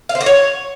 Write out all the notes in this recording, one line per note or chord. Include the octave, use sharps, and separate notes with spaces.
F5
C5
F#4
C#5